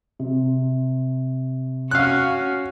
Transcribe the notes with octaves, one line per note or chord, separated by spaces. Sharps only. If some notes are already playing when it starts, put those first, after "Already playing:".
C3
C#4 F#4 F5 F#6